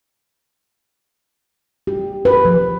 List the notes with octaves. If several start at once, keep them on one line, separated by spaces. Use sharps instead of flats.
G4
B4
F3